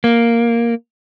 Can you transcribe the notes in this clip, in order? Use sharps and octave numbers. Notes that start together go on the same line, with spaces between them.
A#3